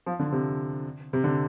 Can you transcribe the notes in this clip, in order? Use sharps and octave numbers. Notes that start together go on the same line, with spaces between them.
F3
D3
C3
C3
D3